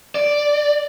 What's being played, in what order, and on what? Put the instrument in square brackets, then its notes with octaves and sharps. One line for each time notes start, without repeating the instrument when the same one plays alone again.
[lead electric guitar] D5